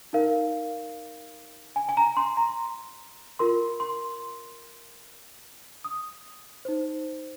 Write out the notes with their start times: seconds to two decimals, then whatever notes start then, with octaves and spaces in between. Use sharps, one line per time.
0.13 D#4 A#4 F5
1.76 G#5
1.89 G#5
1.97 A#5
2.17 C6
2.37 A#5
3.39 F4 A#4 C6
3.80 C6
5.84 D#6
6.65 D#4 C5